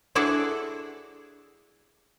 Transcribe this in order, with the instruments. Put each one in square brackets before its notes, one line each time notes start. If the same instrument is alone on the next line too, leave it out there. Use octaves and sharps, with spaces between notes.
[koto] D4 E4 F#4 G#4 A4 D5